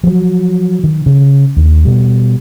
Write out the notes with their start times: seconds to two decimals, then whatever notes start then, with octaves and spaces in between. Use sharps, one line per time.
0.03 F3 F#3
0.84 D#3
1.06 C#3
1.57 D#2
1.85 B2 G3